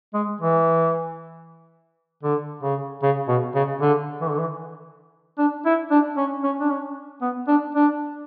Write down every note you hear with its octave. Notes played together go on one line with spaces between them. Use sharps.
G#3
E3
D3
C#3
C#3
B2
C#3
D3
E3
D3
E3
D4
E4
D4
C#4
C#4
D4
C#4
B3
D4
D4